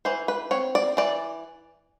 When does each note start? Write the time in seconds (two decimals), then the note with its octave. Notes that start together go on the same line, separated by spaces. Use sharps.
0.05 E3 C5
0.28 B4
0.51 C4 C#5
0.75 D5
0.97 E3 D5